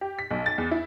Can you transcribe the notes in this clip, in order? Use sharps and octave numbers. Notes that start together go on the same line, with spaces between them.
G4
B6
B1
A6
E2
E4